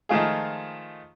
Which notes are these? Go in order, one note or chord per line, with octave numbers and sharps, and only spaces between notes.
D#3 F3 G#3 A3 F4 G#4